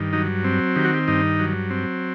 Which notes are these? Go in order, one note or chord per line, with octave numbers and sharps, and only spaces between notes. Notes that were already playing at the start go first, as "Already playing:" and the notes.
Already playing: G2 D#3
F#3 D#4
C4
D#3 G4
F#4
G4
G2 D#4
F#3
C4